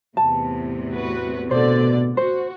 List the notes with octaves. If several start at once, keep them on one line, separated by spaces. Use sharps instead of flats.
E2 A2 C3 A5
F#4 B4
B2 D3 C5 D5
F#4 C5